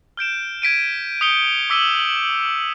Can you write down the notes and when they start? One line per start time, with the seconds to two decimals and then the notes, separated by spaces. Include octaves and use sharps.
0.17 F6 G6 D7 E7
0.62 G#6 B6 D7 D#7
1.21 D#6 G6 B6 C#7 G7
1.70 D6 E6 B6 D#7 F#7 G7
2.00 F#7